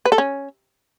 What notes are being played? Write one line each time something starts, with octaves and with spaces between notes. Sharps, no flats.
B4
A4
C#4